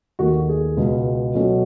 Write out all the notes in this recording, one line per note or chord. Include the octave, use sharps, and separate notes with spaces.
D#2 D#3 A3 F#4
G#4
C#2 B2 G#3
B2 F#3 A3 C#4